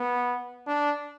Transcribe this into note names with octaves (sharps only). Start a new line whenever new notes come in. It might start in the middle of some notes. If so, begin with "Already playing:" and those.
Already playing: B3
D4